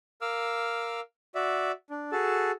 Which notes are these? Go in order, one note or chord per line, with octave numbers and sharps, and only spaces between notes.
A#4 F5 D6 E6 F6
F#4 D5 E5
D4
F#4 G#4 A4 A5